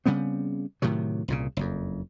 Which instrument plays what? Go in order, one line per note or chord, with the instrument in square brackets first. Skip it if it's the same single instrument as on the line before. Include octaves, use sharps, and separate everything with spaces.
[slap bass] C#3 G3 B3 C4
A2 C3 D#3 F#3
C2 A#2 C#3
F#1 F2